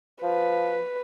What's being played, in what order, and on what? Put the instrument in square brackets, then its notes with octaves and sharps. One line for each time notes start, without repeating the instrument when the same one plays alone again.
[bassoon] F3 [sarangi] B4